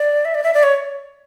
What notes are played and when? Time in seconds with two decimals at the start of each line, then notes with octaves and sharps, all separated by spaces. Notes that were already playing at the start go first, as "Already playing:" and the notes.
Already playing: D5
0.25 E5
0.35 D5
0.44 E5
0.54 D5
0.63 C#5